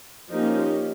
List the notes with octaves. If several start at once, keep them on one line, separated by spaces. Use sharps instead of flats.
F3 A#3 C#4 D#4 G4